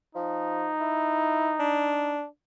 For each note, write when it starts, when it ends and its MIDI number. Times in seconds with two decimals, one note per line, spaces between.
0.15 0.72 53
0.15 2.17 63
0.80 1.52 64
1.59 2.25 62